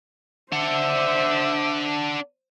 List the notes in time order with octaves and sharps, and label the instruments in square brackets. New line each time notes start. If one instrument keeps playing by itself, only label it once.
[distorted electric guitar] D4 F#5 [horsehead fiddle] C5 E5